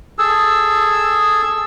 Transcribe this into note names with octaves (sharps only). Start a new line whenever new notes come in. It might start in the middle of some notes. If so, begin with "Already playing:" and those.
G#4 A4 E6